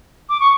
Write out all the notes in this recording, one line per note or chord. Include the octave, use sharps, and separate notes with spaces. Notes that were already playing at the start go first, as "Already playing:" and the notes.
D6
C#6